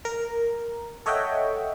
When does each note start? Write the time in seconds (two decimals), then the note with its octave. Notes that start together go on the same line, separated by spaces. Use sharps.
0.05 A#4
1.06 A4 C#5 D#5 E5 F#5 G5